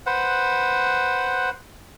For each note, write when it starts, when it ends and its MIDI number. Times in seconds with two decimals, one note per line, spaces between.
0.06 1.50 71
0.06 1.50 72
0.06 1.50 78